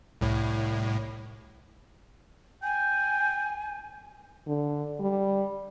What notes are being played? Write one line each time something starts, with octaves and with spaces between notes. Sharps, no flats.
C2 A2
G5 G#5
D3
G3